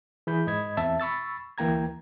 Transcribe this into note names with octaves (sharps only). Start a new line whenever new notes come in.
E3 G#4 B5 G6
G#2 D#5 B5 G#6
E2 C4 E5 A5
B5 C#6 E6 A6
D2 E3 A#3 G5 A#5 G#6